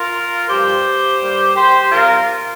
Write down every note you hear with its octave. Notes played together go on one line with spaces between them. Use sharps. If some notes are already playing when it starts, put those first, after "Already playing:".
Already playing: F4 A#4
G2 F3 C4 G4 C5
G2 G3 A#3
G4 C5
C3 G3 C4 F4 A#4